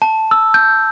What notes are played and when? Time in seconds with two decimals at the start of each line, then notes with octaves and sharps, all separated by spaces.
0.02 A5
0.31 E6
0.54 G6